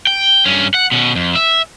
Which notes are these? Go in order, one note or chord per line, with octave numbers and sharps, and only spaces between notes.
G5
G2 C#4
F#5
B2 C#4
F2
E5